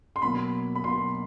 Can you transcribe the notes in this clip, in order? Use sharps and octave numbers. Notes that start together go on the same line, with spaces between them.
C6
B2 F#3 A#3 B5
B5
B2 F#3 A#3 C6